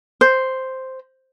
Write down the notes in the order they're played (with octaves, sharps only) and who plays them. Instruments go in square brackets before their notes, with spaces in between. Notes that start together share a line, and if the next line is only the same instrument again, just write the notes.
[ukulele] C5